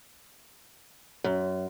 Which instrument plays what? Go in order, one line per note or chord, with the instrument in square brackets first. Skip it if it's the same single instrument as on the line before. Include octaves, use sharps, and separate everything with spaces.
[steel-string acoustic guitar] F#2